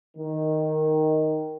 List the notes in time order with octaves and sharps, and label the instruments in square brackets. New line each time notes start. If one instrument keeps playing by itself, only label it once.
[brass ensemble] D#3